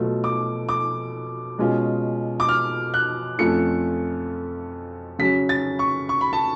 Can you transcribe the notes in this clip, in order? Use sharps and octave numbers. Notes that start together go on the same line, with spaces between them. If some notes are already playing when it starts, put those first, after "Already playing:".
Already playing: B2 F#3 A3 F4
D6
D6
B2 G#3 C#4 F4
D6
F6
F#6
F2 F3 A3 C#4 F4 C#7
C#3 F#3 C#4 B6
A6
C#6
C#6
B5
A5